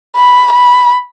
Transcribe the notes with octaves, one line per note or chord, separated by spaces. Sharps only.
B5
B5